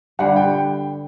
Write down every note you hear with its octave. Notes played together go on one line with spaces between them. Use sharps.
G2 D3 G3 F#5
G5